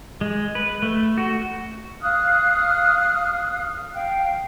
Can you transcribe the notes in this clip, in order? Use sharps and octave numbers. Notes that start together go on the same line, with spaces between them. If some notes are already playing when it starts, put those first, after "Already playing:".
G#3
B4
A3
F#4
F5 D#6 F6 F#6
F5 G5